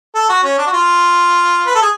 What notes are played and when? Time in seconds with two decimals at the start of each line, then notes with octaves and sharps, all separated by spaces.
0.15 A4
0.29 F#4
0.44 C#4
0.58 D4
0.67 F#4
0.73 F4
1.67 B4
1.75 A4
1.82 G#4